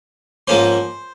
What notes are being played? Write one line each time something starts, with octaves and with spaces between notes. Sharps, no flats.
G#2 F3 A#3 C#4 C5